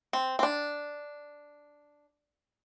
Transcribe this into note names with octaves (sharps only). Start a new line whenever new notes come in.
C4
C4
D4